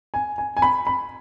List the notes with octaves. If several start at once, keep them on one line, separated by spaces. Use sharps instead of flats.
G#5
G#5
G#5
B5
B5